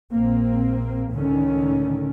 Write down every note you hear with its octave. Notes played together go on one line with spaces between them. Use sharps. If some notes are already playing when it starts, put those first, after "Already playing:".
A#1 A#3 C4
C#2 A2 D3 D#3 C#4